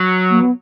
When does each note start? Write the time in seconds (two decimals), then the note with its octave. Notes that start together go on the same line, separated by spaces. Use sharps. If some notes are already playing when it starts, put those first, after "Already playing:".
Already playing: F#3
0.30 A#3
0.41 B3